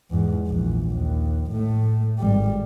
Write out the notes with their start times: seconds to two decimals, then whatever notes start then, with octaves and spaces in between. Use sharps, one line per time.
0.10 E2 G#2
0.47 A#1 E2
0.96 D#2
1.51 A2 A3
2.18 G#1 G3